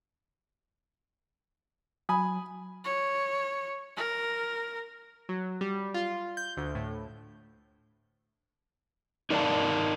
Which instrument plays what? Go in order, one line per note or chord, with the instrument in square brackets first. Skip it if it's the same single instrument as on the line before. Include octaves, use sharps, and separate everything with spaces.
[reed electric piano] F#3 [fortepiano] G#5 B5 D#6
[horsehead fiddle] C#5
A#4
[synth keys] F#3
G3
F4
G6
D2
A2
[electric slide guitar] D#4 A#4 D5 D#5 F5 A5